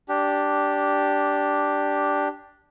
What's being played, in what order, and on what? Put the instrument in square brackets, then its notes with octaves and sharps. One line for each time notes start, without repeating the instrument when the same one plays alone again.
[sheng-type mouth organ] D4 G4